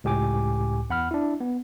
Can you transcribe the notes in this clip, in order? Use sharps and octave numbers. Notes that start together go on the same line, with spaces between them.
C#2 A2 G4 G#5 D6
E2 F#5 B5 F6
D4 E4
B3